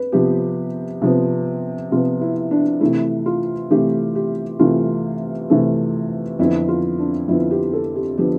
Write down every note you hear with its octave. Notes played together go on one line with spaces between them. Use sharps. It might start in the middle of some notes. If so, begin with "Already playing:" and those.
Already playing: B4
C3 F3 B3 G4
C3 F3 B3
C3 F3 B3 F4
E4
D4
C3 E3 A3 E4
F4
C3 E3 A3 G4
G4
C3 E3 A3 F4
C3 E3 A3
F2 D3 F3 B3 E4
F4
D4
F2 D3 F3 B3 E4
G4
A4
G4
D3 F3 B3 G4